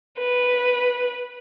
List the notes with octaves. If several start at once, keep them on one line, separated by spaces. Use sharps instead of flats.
B4